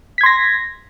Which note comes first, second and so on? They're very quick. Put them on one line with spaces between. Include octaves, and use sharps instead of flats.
B6 G#6 C6 A#6